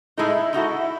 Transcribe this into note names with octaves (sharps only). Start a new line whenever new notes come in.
A2 G#3 D#4 E4 A4
G#3 D#4 E4 F#4 A4